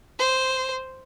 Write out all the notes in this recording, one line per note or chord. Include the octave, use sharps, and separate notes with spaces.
C5